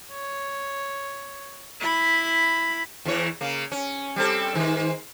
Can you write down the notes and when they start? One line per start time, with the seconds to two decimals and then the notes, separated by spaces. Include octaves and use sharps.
0.12 C#5
1.81 E4 B5
3.05 E2 E3 C#5
3.41 C#3 A#3
3.72 C#4
4.16 G3 C4 A4
4.54 G#2 D#3